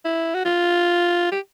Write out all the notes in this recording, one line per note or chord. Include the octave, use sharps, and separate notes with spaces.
E4
F#4
F4
G4